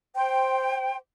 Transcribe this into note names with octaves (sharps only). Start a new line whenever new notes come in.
C5 G5